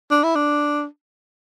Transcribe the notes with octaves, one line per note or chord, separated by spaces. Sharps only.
D4
E4
D4